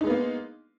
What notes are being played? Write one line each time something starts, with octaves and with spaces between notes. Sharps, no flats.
G#3 A#3 B3 D#4